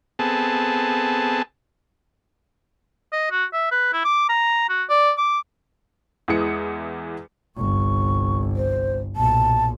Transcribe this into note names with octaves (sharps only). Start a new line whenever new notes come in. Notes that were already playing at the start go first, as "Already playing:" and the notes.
B3 C4 G#4 A4 A5
D#5
F#4
E5
B4
E4
D6
A#5
F#4
D5
D6
E2 E3 G#3 D#6 C#7
G1 C2 C#6
C5
B1 A#2 A5